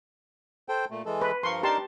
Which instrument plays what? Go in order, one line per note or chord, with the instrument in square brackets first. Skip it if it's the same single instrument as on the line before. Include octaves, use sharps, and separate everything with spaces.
[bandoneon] A4 C5 G5
A#2 A3
E3 G#3 A4
[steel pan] B4
[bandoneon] G2 F3 A#4 [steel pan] C6 C#6
[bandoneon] D4 D#4 A#4 [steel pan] G4 A5 C6